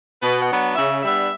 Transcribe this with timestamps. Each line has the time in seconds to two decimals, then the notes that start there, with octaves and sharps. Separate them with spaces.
0.22 B2 B4
0.41 F#5
0.50 F#3 B3 D4
0.75 C#3 E5
1.03 G3 B3 D4 E5